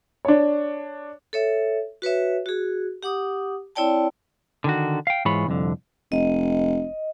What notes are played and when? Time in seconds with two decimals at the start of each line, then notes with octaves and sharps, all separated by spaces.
0.25 D4 C#5
1.33 A4 C#5 E5
2.02 F#4 B4 C#5 E5
2.46 F#4 G#4
3.03 G4 F#5 D6 D#6
3.75 C4 E4 C#5 D5 G5 A5
4.64 D3 D#3 F#4
5.07 F5 G5
5.25 G#2 E3 G#3 F4 C#5 B5
5.47 C2 F2 D3
6.12 F1 D#5